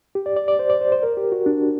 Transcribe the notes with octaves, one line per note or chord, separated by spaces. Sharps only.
G4
D5
D5
D5
C5
D5
C5
C5
A#4
G4
F#4
D4